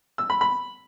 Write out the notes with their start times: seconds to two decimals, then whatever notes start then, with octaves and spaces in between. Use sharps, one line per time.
0.18 E6
0.30 B5
0.41 B5